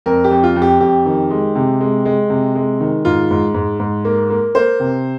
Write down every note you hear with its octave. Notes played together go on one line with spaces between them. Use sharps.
F2 A#4
G4
F2
F4
F2
G4
F2 G4
D#3
G#3
C3
G#3
G#3
C3
G#3
D#3
G#2 F4
G#2
G#2
G#2
A#3
A#3
A#3 C5
C3